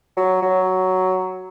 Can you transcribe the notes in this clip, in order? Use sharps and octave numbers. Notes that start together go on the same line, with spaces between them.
F#3
F#3